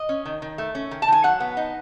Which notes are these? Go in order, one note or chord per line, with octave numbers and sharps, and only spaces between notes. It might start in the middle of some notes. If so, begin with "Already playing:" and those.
Already playing: D#5
C#4
D#3
D#3
A3
C#4
D#3
A5
D#3 G#5
F#3 F#5
B3
D#4